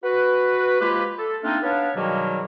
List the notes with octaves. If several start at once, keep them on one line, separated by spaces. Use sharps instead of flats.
F#4 B4
F3 G#3 A#3 F4 G4 B4
A4
A3 A#3 C4 D4 D#4 F4
B3 D4 B4 C#5 F5
G#2 B2 D#3 F#3 G3 A#3